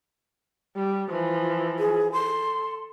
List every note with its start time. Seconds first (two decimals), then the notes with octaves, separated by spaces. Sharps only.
0.76 G3
1.10 E3 F3
1.79 G#4
2.12 A4 C6